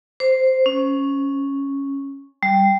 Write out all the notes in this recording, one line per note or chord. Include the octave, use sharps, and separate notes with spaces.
C5
C#4
G3